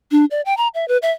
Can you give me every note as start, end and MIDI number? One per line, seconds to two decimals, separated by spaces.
0.11 0.25 62
0.31 0.41 74
0.45 0.56 79
0.57 0.68 82
0.74 0.87 76
0.88 0.97 71
1.02 1.11 76